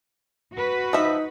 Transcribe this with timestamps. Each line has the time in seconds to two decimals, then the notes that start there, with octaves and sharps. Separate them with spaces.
0.52 F#4 B4
0.93 F3 D#4 E5